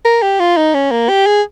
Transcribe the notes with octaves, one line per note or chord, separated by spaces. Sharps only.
A#4
G4
F4
D#4
C#4
A#3
G4
G#4